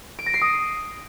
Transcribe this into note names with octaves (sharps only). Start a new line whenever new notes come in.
D7
A#6
C7
D#6